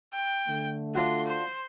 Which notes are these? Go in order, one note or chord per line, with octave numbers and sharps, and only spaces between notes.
G5
D3 A3
D4 F4 F#4 C6
C5